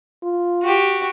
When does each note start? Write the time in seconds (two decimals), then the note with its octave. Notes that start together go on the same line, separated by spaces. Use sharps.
0.23 F4
0.63 F#4 G4